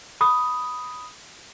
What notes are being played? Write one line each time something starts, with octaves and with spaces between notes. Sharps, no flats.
B5 D#6